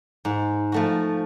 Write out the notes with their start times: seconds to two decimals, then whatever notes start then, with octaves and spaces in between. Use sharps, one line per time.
0.25 G#2
0.72 F3 A3 F#4